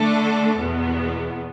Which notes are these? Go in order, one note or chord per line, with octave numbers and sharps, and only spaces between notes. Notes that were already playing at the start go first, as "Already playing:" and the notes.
Already playing: D3 A3 D4 A4
E2 B2 B3